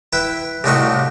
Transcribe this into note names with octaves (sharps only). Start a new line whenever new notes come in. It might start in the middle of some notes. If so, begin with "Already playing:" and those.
E4 B4 G5
C2 A2 C3 D#4 F#4 C#6